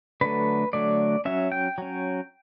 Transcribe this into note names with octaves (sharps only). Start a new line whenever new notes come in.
D3 F#3 A3 B4
D3 F#3 A3 D5
F#3 C#4 E5
G5
F#3 C#4